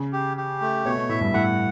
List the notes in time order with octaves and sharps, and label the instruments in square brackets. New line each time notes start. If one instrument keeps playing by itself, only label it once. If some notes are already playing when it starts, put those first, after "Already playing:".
Already playing: [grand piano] C#3
[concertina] G4
G4
A3
[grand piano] B2 [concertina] C#5
[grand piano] B2
[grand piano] A2 [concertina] E5
[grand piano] G2
[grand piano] A2 [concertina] F#5